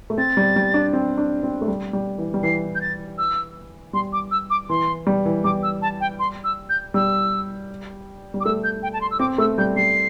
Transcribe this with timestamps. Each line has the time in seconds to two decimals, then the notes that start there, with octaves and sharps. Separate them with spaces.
0.10 A3
0.18 C4 A6
0.37 G3
0.56 G3
0.74 D4
0.93 C4
1.18 D4
1.43 C4
1.61 A3
1.68 G3
1.93 G3
2.18 E3
2.34 G3
2.43 E3 C7
2.75 G6
2.81 A6
3.18 E6
3.93 G3 C6
4.13 D6
4.31 E6
4.50 D6
4.69 E3 C6
5.07 G3
5.25 E3
5.44 G3 D6
5.63 E6
5.82 A5
6.00 G5
6.19 C6
6.44 E6
6.69 G6
6.94 G3 E6
8.34 G3
8.40 D6
8.45 A3 E6
8.64 G6
8.83 G5
8.93 A5
9.01 C6
9.11 E6
9.19 C4 D6
9.38 A3 E6
9.58 G3 G6
9.76 G3 C7